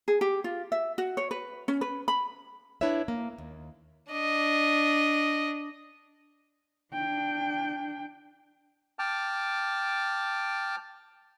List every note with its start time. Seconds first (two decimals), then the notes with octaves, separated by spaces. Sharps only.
0.08 G#4
0.21 G4
0.44 F4
0.72 E5
0.98 F#4
1.17 C#5
1.31 B4
1.68 C#4
1.81 B4
2.08 B5
2.81 D4 E4 B4 C#5 E5
3.08 A#3
3.38 D#2
4.11 D4 D#5
6.94 D4 G5
8.99 G5 A5 D6 F6